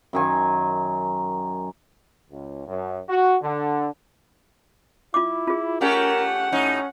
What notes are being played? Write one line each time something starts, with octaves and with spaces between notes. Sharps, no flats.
F#2 D#3 G#5
C#2
F#2
F#4
D3
E4 F4 D6
F4 G#4
A3 C#4 G4 A#4 F#5
A2 C#4 D#4